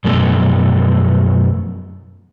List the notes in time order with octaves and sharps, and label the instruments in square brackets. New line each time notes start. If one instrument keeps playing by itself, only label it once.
[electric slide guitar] F#2 B2 F3 A3